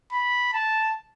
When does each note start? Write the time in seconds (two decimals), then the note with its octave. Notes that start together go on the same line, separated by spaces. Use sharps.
0.12 B5
0.53 A5